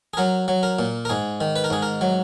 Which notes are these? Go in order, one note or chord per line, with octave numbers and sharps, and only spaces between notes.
G#4
F#3 A#4
F#3
A#4
A#2
A#4
G#2 G#4
D#3
B4
A#4
G#2 G#4
A#4
F#3